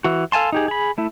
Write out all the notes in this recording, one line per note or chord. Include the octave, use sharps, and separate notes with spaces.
E3 F#4
A4 F5 G#5 A5 C6
D#4 G4 G#4
G#4 B5
A3 E4